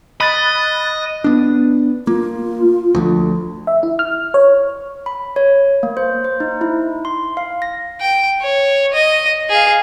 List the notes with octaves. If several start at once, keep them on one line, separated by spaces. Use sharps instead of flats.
D#5 B5 F#6 A6
B3 D4
A#3 F4
D2 F3
E5
E4
F6
C#5
B5
C#5
A#3
C5
C5
D#4
E4
C6
F5
A#6
G5
C#5
D#5
G#4 F5